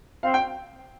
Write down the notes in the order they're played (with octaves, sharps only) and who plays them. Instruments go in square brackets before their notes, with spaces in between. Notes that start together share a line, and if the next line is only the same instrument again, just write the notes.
[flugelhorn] C4 [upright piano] F5
[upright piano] G5